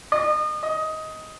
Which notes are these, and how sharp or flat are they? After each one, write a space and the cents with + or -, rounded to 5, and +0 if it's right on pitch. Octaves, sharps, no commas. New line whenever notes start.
D#5 -35
D#5 +15